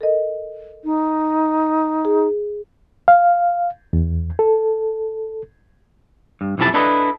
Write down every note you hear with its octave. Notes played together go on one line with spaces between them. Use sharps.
A4 A#4 D#5
D#4
G#4
F5
E2
A4
G2
B1 F2 C3 E4 A5
D4 E4 A4 B4 D#5